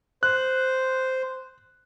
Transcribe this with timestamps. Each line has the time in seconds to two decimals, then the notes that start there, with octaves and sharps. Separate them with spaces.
0.23 C5 F#6